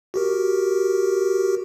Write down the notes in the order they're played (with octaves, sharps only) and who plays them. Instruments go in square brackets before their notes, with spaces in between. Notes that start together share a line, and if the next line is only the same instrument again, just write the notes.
[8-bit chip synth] F#4 G4 A#4